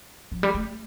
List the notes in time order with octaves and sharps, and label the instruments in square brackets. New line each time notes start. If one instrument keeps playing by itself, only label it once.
[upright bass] F3
G3
A3